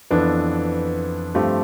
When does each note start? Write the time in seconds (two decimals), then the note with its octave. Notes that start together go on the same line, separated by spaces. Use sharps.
0.11 F2 E3 B3 D4 A4
1.35 G2 F3 A3 C4 G4